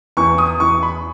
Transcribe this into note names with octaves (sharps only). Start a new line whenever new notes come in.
E2 C#6
D#6
E2 C#6
B5